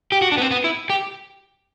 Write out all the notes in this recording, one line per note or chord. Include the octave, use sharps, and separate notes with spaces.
G4
F#4
D4
B3
C4
B3
E4
G4